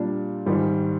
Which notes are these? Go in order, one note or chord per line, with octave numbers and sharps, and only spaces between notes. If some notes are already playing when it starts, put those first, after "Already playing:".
Already playing: A#2 G3 D4
G#2 D#3 G3